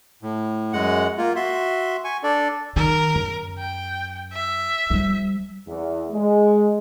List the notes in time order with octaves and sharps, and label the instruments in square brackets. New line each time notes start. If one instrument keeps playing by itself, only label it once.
[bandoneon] A2
F#2 G#3 F#5
A#3 F4
F#4 E5 C6
G#5 C#6
D4 A4 D5
[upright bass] D#3 [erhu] A#4
[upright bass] F#2
[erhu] G5
E5
[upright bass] F3 G3
[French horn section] E2
G#3